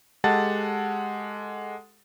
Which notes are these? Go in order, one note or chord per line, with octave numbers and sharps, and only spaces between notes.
G#3 G4 A4 F#5 A5 A6